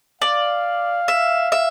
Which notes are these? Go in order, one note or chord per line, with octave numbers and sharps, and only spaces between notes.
D5 F5
E5
E5